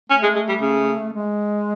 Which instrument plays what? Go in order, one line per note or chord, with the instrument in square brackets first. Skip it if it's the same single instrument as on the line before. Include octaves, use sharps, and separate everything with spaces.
[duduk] A3 [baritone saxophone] C#4
[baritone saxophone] G#3
G#3
G3
C#3
[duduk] G#3